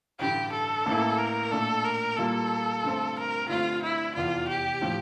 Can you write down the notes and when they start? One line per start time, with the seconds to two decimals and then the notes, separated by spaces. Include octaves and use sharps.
0.19 A1 G2 D3 G4
0.53 A4
0.86 A1 A2 E3 A#3 E4
1.19 A#4
1.51 A#2 A3 D4 A4
1.84 A#4
2.17 A#2 G3 A#3 F4 A4
2.83 G2 D3 A3 C4
3.17 A#4
3.49 G2 D3 A3 C4 F4
3.82 E4
4.15 F1 E2 E3 F4
4.48 G4
4.81 A2 F3